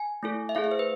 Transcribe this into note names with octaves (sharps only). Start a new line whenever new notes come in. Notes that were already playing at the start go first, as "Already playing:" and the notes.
Already playing: G#5
A3 E4 A4
E5
A3 E4 G#4 F5
E5
C5
B4